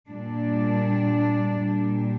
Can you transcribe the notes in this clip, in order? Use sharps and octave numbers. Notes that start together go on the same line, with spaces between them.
A#2 G3 D4
A#2 G3